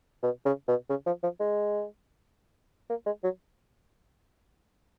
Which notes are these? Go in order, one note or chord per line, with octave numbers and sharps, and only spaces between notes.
B2
C#3
B2
C#3
F3
F3
G#3
A#3
G#3
F#3